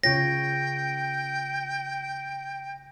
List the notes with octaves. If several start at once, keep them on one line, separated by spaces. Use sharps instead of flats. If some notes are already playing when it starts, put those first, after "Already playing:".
C#3 F4 C#5 G5 A#6